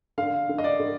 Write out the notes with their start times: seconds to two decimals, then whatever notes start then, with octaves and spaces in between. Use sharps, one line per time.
0.18 D3 F5
0.49 D3
0.58 D#5
0.64 D5
0.80 D3